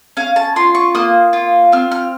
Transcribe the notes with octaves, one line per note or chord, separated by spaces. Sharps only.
C#4 F5
A5
F4 C6
C#6
A#3 D#6
F4
C4 F6
F6